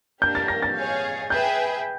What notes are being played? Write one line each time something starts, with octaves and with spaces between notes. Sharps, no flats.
A#3 D4 G4 A#4 G6
A6
A#6
A6
G#4 C#5 F5
G#4 B4 E5 G5 G6